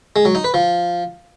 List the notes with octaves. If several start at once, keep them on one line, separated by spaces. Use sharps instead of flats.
G#3
F#3
D#4
B4
F3